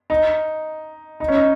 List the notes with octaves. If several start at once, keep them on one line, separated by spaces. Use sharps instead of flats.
D#4
D#4
C#4
D#4